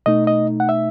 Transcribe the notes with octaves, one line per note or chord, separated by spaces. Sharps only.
B2 A3 D#4 D#5
D#5
F#5
E5